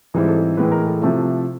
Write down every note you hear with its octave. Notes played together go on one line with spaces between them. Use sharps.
G#2 E3 G3 C4 E4 G#4
A4
A2 E3 G#3 B4
A#4
A4
C3 F3 A3 C4 E4